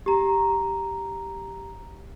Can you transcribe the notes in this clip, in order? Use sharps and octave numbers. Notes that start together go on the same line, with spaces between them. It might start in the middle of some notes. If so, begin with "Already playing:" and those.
G4 A#5